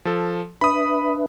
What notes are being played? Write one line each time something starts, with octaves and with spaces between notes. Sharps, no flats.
F3 A4
D4 B4 E5 B5 D#6